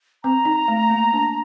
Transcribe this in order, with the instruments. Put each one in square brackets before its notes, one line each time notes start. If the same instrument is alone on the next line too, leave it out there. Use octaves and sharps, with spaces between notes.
[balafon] C4 [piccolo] A#5
[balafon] D#4
A3
A#3
D4